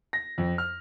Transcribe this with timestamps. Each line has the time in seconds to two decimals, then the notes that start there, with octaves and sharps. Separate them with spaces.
0.13 A#6
0.38 F2
0.58 F6